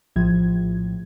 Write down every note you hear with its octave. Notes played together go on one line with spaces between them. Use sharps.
A#1 A2 F3 G#6